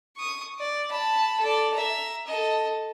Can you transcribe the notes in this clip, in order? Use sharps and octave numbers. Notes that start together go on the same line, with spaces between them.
C#6 D#6
D5
A5 B5
A4 D5
E5 A#5
A4 D#5